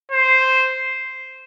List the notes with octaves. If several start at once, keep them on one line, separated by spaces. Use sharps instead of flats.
C5